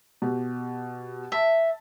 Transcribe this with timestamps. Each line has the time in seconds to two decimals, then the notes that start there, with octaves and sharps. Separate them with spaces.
0.22 B2 G4
1.32 E5 A5